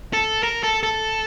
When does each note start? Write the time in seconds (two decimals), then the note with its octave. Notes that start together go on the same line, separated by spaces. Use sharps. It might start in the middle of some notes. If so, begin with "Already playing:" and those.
0.13 A4
0.43 A#4
0.63 A4
0.83 A4